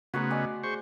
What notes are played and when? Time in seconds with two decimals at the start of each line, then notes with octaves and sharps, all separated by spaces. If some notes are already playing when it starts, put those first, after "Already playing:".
0.14 C#3 A3 B3 F#4 C5 A#5
0.30 D5 D#5 G#5 E6
0.63 G#4 C5 C#6